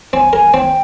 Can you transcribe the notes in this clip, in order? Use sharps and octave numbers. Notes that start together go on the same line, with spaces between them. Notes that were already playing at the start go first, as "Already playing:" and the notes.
C4 G#5
A#4 G#5
C4 G5